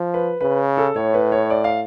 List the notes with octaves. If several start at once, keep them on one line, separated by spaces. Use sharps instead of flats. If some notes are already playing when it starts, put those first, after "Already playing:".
Already playing: F3
B4
C#3 B4
A4
A2 C#5
B4
C#5
D5
F5